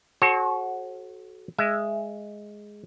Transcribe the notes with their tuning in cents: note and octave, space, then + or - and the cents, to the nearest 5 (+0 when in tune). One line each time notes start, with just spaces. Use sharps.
F#4 +0 A4 -35 C#5 -45
G#3 +0 E5 +25